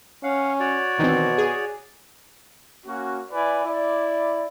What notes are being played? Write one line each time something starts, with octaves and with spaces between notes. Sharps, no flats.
C#4 F5 F#5
F#4 C#5 D5
B2 D#3 E3 C4
G#4
A#3 C#4 F#4
E4 B4 D5 G#5
E4 D5